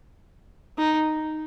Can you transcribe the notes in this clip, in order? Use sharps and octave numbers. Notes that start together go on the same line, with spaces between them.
D#4